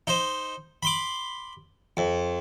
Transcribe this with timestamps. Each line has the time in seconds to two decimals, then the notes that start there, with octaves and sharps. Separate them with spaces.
0.07 D#4 C5
0.83 B5 C6 D6
1.97 F2